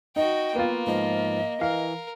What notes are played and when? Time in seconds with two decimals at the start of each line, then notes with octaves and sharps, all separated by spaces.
0.16 D#4 F#4 D#5 G5
0.55 A#3 B3 F4
0.87 G#2 F3 D#5
1.61 E3 A#4 F5